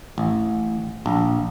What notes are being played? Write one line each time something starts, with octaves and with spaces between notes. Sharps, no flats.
A1
A#1